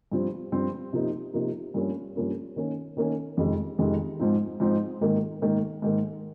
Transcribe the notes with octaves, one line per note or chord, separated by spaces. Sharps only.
G2 F3 C4
G2 F3 C4
C3 F3 A#3 D#4
C3 F3 A#3 D#4
G2 F3 A#3 C#4
G2 F3 A#3 C#4
D#3 A#3 C#4
D#3 A#3 C#4
F2 C3 D#3 G#3
F2 C3 D#3 G#3
G#2 F3 C4 D#4
G#2 F3 C4 D#4
G#2 D#3 A#3
G#2 D#3 A#3
G#2 D#3 A#3